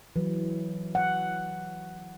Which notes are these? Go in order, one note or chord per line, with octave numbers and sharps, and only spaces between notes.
E3 F#3
F#5